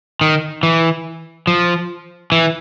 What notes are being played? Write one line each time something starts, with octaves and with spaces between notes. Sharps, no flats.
D#3
E3
F3
E3